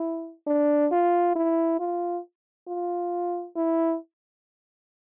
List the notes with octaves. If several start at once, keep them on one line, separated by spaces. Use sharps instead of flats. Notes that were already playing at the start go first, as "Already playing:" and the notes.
Already playing: E4
D4
F4
E4
F4
F4
E4